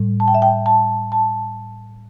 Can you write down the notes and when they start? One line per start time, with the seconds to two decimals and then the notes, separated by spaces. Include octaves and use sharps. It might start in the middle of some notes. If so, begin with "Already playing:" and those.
Already playing: A2 G3
0.20 A5
0.28 G5
0.34 E5
0.42 G5
0.66 A5
1.12 A5